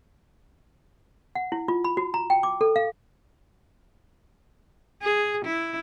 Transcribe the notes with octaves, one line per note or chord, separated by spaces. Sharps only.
F#5
E4
F4
B5
F#4
A#5
G5
D6
A4
F5
G#4
E4